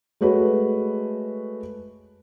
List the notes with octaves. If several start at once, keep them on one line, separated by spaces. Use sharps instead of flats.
G#3 A3 F#4 B4 C#5